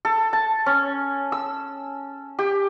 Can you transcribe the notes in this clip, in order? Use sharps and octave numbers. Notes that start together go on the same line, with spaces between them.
A4
A5
C#4
E6
G4